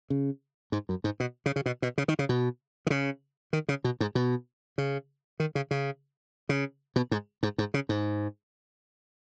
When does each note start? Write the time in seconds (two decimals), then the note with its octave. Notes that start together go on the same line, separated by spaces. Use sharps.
0.10 C#3
0.72 G#2
0.89 F#2
1.04 G#2
1.20 B2
1.46 C#3
1.56 C#3
1.66 B2
1.82 B2
1.98 C#3
2.08 D#3
2.19 C#3
2.29 B2
2.87 D#3
2.90 C#3
3.53 D#3
3.69 C#3
3.84 B2
4.00 G#2
4.15 B2
4.78 C#3
5.40 D#3
5.55 C#3
5.71 C#3
6.49 C#3
6.96 B2
7.11 G#2
7.43 G#2
7.58 G#2
7.74 C#3
7.89 G#2